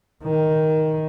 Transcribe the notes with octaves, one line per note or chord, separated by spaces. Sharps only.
D#3